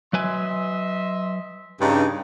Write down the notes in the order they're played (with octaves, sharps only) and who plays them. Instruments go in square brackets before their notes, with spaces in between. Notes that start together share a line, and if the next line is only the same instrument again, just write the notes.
[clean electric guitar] F#3 B4 G#5 [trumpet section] D#5 E5 C6
[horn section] G2 C#3 D#4